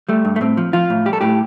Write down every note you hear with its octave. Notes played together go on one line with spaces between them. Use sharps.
G3 A3
G2
A3
A2 C4
F3
F3 F4
A2
G3 G4
A4
A2 G4